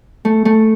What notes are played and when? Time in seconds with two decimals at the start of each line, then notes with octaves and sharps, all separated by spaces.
0.25 A3
0.45 A3